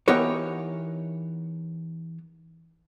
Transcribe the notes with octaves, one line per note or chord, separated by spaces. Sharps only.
E3 B3 D#4 G4 A#4 C#5